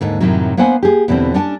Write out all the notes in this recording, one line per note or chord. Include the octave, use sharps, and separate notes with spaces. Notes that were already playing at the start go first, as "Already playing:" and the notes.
D#2 G#2 D3
F#2 A2 C3 D#3 F#3
A#3 B3 D4 C5 F#5 G#5
G4 G#4
E2 B2 D3 E3 C4
C#4 D4 G#5 A5